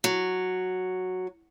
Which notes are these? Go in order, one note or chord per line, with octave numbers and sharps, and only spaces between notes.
F#3